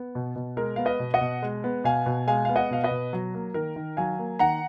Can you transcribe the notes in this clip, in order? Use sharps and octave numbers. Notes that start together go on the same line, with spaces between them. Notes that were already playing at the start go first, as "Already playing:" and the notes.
Already playing: B3
B2
B2
G#3 A#4
B3 F5
B4 D#5
B2
D#5 F#5
B2
G#3
B3
B2 F5 G#5
B2
G#3 F5 G#5
B3 F5
D#5 F#5
B2 F5
B4 D#5
B2
F#3
A#3
D#3 A#4
D#3
F#3 F5 G#5
A#3
D#3 F#5 A#5